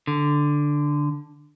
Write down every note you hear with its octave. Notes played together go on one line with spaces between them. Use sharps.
D3